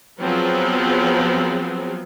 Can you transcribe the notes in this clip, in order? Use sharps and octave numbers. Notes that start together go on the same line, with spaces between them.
F3 F#3 B3 C4 G#4